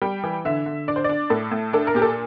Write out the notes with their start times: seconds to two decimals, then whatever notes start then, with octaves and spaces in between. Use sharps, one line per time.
0.02 G3 G5
0.23 E3
0.45 D3 E5
0.66 D3
0.88 D4 D5
0.96 C5
1.04 D4 D5
1.30 A2 A4
1.51 A2
1.73 D4 A4
1.87 A#4
1.94 A#2 G4
2.02 A4